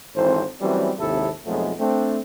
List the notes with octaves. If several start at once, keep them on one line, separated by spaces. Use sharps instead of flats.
G#1 E3 C4 A4 C5
E3 F#3 G3 A3 C4 C#4
G#1 D#2 C3 E4 A4
B1 F2 F3 F#3 G#3 A3
A3 C4 D4